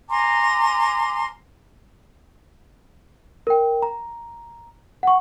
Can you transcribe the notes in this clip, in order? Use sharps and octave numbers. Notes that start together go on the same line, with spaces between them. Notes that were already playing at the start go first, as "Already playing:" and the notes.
G#5 A#5 C6 D6
A#4 G5
A#5
F#5 C#6